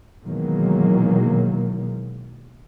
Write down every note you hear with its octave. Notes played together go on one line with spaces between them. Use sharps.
B2 D#3 E3 F#3 G#3 A#3